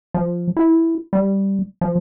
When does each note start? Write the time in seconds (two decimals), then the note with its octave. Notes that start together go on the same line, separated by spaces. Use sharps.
0.14 F3
0.57 E4
1.13 G3
1.81 F3